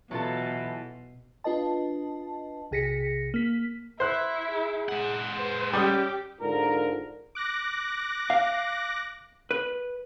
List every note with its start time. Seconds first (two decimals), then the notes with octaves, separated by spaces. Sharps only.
0.11 B2 E3 F#3 F4 A4
1.44 D4 F4 B4 D#5 A5
2.71 B1 C3 G#4 A#6 B6 C#7
3.34 A#3 B6
4.00 E4 C5 F#6
4.50 G#4
4.89 G#3 F#5
5.38 B4 C5
5.73 G3 C#4 G4 D#6
6.40 G#2 D3 F4 A#4
7.35 D6 F#6 A#6
8.30 F5
9.51 B4